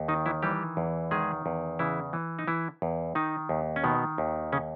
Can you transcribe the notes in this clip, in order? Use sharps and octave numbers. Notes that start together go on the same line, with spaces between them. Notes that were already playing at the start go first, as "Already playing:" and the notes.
Already playing: D#2
D#3 D#4
E3 E4
E3 G3 G4
E2
D#3 G#3 G#4
E2
C#3 E3 E4
E3
D#4
E3 E4
E2
D#3 D#4
D#2
C#4
B2 D#3 B3
D#2
C#3 C#4